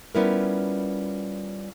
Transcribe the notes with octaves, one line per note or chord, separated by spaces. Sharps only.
G3 B3 C#4 E4 F4 A#4